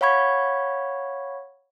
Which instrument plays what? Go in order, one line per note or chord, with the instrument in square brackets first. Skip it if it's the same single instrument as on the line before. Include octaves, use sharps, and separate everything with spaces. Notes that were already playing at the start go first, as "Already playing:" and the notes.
[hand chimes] C#5 F5 F#5 B5 C#6 G#6